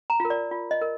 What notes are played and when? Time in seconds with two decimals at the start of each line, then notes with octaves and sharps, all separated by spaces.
0.10 A#5
0.20 F4 A#4
0.30 D5
0.51 F4
0.71 D#5
0.81 A#4